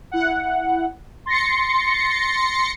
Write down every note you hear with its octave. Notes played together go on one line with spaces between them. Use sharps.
E4 F#5
C6 A6 A#6 C7 C#7